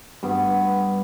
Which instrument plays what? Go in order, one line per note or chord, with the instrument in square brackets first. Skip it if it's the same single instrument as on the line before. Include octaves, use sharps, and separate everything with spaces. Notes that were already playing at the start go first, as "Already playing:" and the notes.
[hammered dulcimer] G2 B3 B4